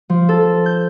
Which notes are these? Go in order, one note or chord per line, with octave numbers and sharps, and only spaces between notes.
F3
A4
G6